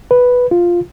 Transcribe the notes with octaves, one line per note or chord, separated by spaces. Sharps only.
B4
F4